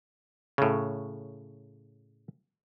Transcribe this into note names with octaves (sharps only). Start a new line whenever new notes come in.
A2 C#3